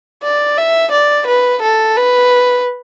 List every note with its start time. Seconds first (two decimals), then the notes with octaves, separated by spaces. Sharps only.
0.23 D5
0.58 E5
0.92 D5
1.27 B4
1.63 A4
1.97 B4